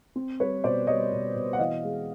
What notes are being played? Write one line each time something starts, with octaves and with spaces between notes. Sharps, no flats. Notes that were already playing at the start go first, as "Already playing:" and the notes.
C4
G3 B4 C#5
B2 C5 D5
G3 C#5 D#5
B2
B2
F#5
E3 D#5 F5
G#3